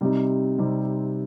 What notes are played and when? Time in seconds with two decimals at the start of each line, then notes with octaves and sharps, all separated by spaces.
0.01 C3 G3 C4 D#4
0.58 C3 G3 C4 D#4